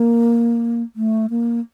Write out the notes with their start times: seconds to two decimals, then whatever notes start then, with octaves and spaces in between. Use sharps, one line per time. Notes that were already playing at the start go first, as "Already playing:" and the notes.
Already playing: A#3
0.96 A3
1.30 A#3